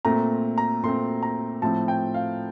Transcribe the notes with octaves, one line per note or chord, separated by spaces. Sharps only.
A#2 A3 C4 A#5
A#5
A#2 A3 C4 C6
A#5
A2 F3 C4 A5
G5
F5